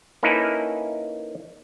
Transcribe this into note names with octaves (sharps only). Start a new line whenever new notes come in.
A#3 C#4 D#4 E4 A4 B4